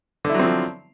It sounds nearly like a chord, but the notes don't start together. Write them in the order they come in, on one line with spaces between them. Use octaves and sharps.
D3 E4 F#3 C4 F3